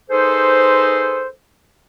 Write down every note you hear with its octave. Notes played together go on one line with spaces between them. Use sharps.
D#4 G#4 A4 B4 C5